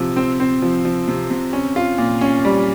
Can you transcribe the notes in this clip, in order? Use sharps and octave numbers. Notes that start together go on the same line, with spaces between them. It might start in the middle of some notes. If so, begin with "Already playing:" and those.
Already playing: C3 F3
C4
C4
F3
F3
C3
C3
C#4
F4
A#2
C#4
G3